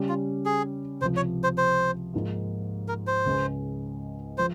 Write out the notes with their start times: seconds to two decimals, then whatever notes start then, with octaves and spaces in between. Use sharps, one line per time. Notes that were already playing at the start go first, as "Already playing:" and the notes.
Already playing: C#3 G3 C#4
0.09 F4
0.46 G#4
1.01 C#2 C3 F3 C5
1.16 C#5
1.44 C5
1.58 C5
2.14 G#2 F3 A#3 F4
2.88 A#4
3.07 C5
3.26 C#2 C#3 G#3
4.38 F3 C5